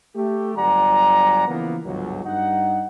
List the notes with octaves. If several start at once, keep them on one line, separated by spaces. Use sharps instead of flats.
A3 G4
G1 F#3 D5 F#5 G#5 A#5
C#3 E3 F3 A#3 B3
G1 C#2 G#2 F#3
G2 D#4 F#5